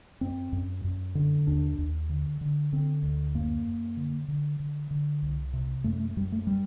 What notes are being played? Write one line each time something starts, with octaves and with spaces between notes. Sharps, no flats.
F#2 C4
F#2
F#2
D3
D#2 D4
D#2
D3
D3
D3 C4
D2
F#2 A#3
F#2
D3
D3
D3
D3
C2
C3
F#2 A3
A3
F#2 G3
A3
G3